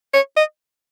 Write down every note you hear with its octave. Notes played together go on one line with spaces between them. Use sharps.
C#5
D#5